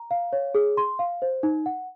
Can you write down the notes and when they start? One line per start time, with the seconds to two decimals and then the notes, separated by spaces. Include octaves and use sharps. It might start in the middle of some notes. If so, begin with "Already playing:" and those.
Already playing: A#5
0.11 F5
0.33 C#5
0.55 G#4
0.77 C6
0.99 F5
1.22 C5
1.43 D#4
1.66 F#5